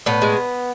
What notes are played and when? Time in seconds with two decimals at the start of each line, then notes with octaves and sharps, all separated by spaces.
0.06 A2 B3
0.22 G#3